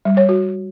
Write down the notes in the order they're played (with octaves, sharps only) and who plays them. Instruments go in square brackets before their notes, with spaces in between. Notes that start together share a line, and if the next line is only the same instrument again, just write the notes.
[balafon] G3
C#5
F#4